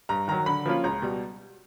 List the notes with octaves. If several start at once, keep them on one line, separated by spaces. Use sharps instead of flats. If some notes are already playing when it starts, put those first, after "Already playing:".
G2 A#5
D#3 F#3 A#5
D3 B5
F3 A#3 C#4 F4
C#2 A#5
B2 G3